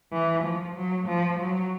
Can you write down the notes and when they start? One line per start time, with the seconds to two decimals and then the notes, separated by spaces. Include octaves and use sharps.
0.13 E3
0.44 F3
0.76 F#3
1.08 F3
1.40 F#3